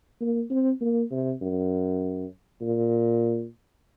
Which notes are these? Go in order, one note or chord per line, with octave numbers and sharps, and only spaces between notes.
A#3
C4
A#3
C3
F#2
A#2